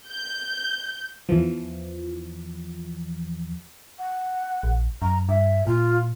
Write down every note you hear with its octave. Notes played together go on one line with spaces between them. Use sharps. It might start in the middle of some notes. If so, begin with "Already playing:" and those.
G6
E2 E3 F3
F#5
A#1
F#2 A#5
G2 E5
A#2 F4